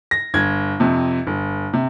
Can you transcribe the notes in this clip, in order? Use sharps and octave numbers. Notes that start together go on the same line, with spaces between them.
A#6
G1 G#6
F2 C3
G1
C3